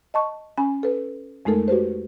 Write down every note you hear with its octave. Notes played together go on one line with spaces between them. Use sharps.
D#5 A5 C#6
C#4 G#5 B5
A4 B4
F2 G#3 A3 D#4 A4 A#4
F#4 G4 B4 C5